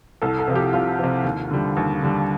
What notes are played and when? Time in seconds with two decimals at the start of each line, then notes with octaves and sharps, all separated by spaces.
0.22 C2 A4
0.39 A4
0.48 C3 F3
0.55 G4
0.73 C2 F4
0.99 C3 F3
1.24 D#2
1.51 D3 G3
1.77 D#2
2.02 D3 G3